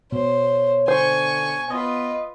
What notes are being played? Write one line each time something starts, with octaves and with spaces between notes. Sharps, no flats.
B2 C5 C#5
D3 C5 G#5 C#6
B3 F4 B4 D#5